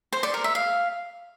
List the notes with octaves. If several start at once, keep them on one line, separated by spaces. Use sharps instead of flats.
C5
D5
A#4
E5
F5